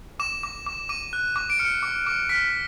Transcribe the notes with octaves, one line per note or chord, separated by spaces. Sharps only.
D6 E7
D6
D6
D6 D#7
F#6
D6
D7
F6 C#7
D6
D6
F6 B6